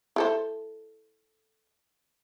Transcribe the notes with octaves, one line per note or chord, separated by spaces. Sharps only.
E4 A4 C5